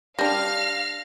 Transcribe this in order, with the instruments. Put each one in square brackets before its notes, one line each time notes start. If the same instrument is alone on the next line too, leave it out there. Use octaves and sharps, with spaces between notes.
[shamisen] G3 D4 [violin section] F5 F6 [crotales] A#6